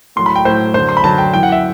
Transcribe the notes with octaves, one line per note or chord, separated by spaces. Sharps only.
A2 F#3 C6
B5
G5
A2 F#3 C5
F#2 D3 F#3 C5
C6
B5
F#2 D3 F#3 A5
G5
F#2 E3 G5
F#5
E5